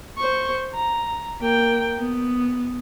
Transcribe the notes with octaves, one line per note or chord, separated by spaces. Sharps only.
C5 C#6
A#5
A#3 G5
B3